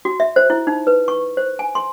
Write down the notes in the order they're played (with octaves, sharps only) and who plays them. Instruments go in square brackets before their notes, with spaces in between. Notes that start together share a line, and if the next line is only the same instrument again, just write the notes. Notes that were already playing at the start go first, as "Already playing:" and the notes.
[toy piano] F#4
E5
C5
E4
D#4
B4
C#6
C5
G#5
C6